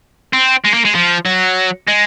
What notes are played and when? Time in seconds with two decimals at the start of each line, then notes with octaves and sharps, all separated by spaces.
0.33 C4
0.65 G#3
0.74 A#3
0.85 G#3
0.95 F3
1.25 F#3
1.88 G#3